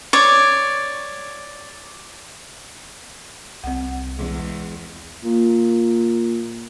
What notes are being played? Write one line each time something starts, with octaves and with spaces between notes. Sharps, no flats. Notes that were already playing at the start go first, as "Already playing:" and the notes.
C#5 D5
C2 C4 F#5
E2 G#3
A#2